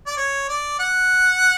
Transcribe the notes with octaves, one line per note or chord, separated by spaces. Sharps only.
D5
C#5
D5
F#5